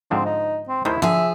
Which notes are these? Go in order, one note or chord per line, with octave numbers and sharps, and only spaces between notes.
G#2 D3 F3 C4
D#4
C4
D#2 D#3 A3 E4 C5
D3 F3 G#4 E5